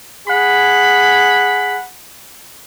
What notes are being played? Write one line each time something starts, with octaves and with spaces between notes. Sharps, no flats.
G#4 F#5 B5